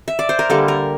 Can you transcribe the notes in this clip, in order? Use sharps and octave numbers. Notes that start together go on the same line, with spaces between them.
E5
D5
C5
A#4
D3 G3 A#3 A4
A#4